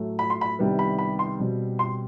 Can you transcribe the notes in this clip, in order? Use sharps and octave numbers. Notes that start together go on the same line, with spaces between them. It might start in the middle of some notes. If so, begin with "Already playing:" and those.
Already playing: A2 F#3 A3
B5
C6
B5
C2 C3 D#3 G3 B3
B5
B5
C6
B2 G3 C4
C6